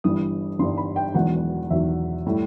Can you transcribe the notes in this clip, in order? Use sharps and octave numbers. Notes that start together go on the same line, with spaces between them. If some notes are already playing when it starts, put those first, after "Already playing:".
G1 G2 E3 G3 D#6
G1 G2 E3 G3 C6
B5
G5
E1 E2 D#3 F#3 F#5
E1 E2 D#3 F#3 E5
A2 G3